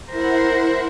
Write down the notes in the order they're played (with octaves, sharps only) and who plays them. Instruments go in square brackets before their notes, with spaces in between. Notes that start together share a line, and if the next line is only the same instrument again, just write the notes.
[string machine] E4 F#5 [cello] A#4 C5